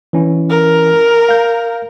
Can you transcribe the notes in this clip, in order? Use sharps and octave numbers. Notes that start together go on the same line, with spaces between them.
E3 C#4 E4
A#4
F5 G6